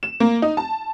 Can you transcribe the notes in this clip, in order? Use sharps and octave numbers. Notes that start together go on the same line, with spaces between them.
E7
A#3
D#4
A5